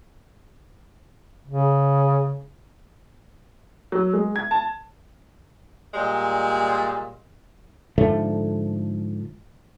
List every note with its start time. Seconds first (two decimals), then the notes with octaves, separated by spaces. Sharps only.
1.47 C#3
3.92 F#3
4.13 G#3
4.36 G#6
4.51 A5
5.94 A#2 G3 G#3
7.98 G#2 D3 F3 A3